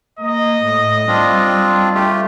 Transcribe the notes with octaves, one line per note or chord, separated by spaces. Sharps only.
A#3 D#5
A2
G3 C4 D4 F4
A3 F4 G4